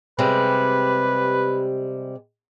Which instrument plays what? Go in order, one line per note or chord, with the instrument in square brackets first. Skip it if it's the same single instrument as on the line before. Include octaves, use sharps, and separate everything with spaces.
[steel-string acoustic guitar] C3 G3 G#3 [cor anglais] B4